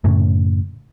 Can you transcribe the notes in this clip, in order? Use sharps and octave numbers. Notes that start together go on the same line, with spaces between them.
F#2 A2 C#3